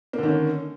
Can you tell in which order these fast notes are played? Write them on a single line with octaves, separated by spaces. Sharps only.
A#3 D3 D#3 C#4